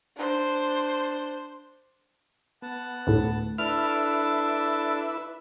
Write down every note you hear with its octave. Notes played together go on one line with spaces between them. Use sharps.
D4 C5
B3 F#5 A5
D2 A2
D4 E4 A4 B4 E5 D6 F6